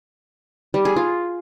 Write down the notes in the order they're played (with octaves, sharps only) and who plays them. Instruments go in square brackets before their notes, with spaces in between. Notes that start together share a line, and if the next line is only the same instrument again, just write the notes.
[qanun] G3
G#4
F4